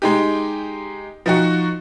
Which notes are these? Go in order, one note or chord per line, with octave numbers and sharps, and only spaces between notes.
G#3 D#4 G4
F3 D#4 F#4